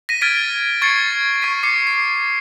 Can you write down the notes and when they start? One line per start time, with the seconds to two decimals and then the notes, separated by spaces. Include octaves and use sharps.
0.09 A#6 B6 D#7
0.21 F6 G#6 A6 B6 D7 D#7
0.82 C#6 G#6 A6 C7 C#7
1.42 C#6 G#6 B6 D#7
1.63 D6 C7 C#7
1.87 C7